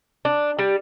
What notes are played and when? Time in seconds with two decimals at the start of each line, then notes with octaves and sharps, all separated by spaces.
0.25 D4
0.59 G3